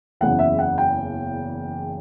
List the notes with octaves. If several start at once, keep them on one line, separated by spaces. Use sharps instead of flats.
F#1 E2 C#3 F#5
E5
F#5
G5